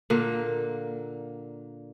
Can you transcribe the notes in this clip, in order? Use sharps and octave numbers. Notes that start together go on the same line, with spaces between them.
A#2 D3 A#3